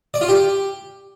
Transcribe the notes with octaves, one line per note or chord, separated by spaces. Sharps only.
D5
F4
G4